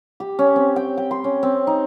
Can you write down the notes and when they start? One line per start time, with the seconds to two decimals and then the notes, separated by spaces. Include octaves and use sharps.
0.20 G4
0.39 C#4
0.56 C4
0.76 G5
0.97 G5
1.11 C6
1.24 C#4
1.43 C4
1.67 D#4